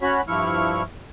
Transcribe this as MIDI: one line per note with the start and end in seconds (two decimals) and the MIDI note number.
0.02 0.21 61
0.02 0.21 66
0.02 0.21 73
0.02 0.21 83
0.28 0.83 43
0.28 0.83 53
0.28 0.83 64
0.28 0.83 85
0.28 0.83 89